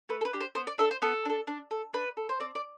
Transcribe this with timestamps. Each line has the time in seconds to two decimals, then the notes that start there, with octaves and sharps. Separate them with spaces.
0.09 A3 B4
0.21 A4
0.25 B4
0.33 D4 G4
0.41 C5
0.55 B3 C5
0.67 D5
0.78 D4 A4 E5
0.91 C5
1.02 B3 A4
1.25 D4 A4
1.47 D4
1.71 A4
1.93 D4 B4
2.17 A4
2.29 C5
2.40 C4 D5
2.55 D5